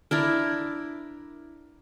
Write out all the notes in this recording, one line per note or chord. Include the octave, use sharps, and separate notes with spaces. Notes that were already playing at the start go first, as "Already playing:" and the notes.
D4 E4 A#4